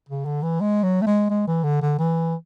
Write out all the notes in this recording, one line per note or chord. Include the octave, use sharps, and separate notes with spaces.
C#3
D3
E3
G#3
F#3
A3
G#3
G#3
E3
D3
D3
E3